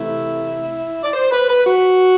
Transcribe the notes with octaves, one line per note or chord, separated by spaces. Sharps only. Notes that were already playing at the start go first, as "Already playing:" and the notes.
Already playing: C3 E3 A3 E4
D5
C5
B4
B4
F#4